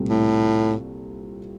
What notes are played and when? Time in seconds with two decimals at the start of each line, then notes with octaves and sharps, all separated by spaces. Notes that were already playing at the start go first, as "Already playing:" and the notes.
Already playing: C2 A#2 A3 C4
0.09 A2